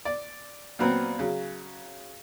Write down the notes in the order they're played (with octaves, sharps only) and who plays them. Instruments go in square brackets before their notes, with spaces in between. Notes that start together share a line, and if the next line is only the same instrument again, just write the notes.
[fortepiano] D5
A#2 F#3 B3 C4
C#3 F#3